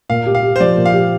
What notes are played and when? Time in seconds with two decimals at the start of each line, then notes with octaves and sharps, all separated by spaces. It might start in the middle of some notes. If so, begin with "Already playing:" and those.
0.09 A#2 F5
0.26 G4
0.35 F5
0.43 G4
0.56 C5
0.60 F3 D5
0.77 A#2
0.86 F5
0.94 G4